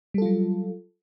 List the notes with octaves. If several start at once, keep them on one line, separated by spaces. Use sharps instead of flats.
F#3 G3 F4 A4